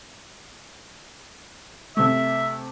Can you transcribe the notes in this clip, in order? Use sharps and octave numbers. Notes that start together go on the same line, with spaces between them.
C3 A3 E5